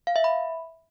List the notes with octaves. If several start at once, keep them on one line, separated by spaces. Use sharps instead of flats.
F5
E5
B5